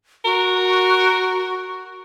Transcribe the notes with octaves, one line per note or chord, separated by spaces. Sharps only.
F#4 A#4